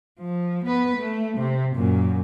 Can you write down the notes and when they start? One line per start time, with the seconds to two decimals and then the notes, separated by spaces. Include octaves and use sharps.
0.20 F3
0.65 B3 B4
0.97 A3
1.38 C3
1.76 F#2 A#2